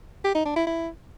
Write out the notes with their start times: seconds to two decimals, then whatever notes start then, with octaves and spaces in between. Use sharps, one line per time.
0.24 G4
0.35 D#4
0.46 D4
0.56 E4
0.67 E4